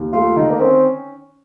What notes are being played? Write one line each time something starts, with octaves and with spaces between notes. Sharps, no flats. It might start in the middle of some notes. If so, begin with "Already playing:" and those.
Already playing: D#2
A3 F4
D#3 D#4
A#3
C4 C#4